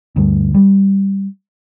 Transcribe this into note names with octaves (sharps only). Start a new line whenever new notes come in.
D2 G2
G3